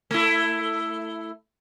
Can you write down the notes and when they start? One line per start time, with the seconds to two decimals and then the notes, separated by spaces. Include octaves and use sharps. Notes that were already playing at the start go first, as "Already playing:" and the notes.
0.11 A3 E4